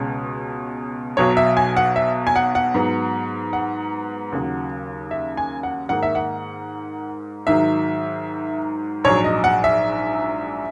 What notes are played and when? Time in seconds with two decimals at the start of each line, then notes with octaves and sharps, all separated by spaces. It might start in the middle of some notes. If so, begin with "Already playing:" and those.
Already playing: C#2 B2 G#3 C#4
1.17 B1 B2 F#3 C#5
1.37 E5
1.57 G#5
1.77 F#5
1.96 E5
2.27 G#5
2.36 F#5
2.55 F#5
2.74 G#2 F#3 B3
3.53 F#5
4.32 D#2 C#3 F#3
5.11 E5
5.37 G#5
5.63 F#5
5.89 G#2 D#3 A#3 F#5
6.03 E5
6.15 F#5
7.47 G#2 D#3 F#3 E5
9.04 A#1 G#2 F#3 C#5
9.24 D#5
9.44 F#5
9.64 E5